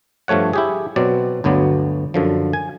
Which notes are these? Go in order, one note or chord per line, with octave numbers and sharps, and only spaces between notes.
G2 F3 A3 C#5 F#5
E4 G4 G#4
B2 F#3 C4 D5
G1 D2 F#3 B3 D5
F#2 D3 F3
G#5